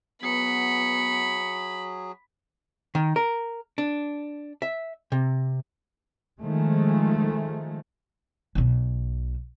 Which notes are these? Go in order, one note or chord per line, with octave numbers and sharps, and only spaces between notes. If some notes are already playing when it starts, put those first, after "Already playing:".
F#3 B3 G#4 B5 C#7
D#3
A#4
D4
E5
C3
D#3 F3 G#3 A3
B1 B2